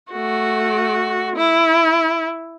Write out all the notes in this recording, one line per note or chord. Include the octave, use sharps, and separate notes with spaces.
A3 F#4
E4